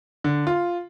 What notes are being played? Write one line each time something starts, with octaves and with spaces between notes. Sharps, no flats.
D3
F4